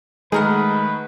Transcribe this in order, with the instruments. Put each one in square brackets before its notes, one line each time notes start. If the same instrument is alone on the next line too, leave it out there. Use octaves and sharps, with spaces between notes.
[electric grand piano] D#3 A3 [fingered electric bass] G#3 [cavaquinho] G#4 A#4 F#5 [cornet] B4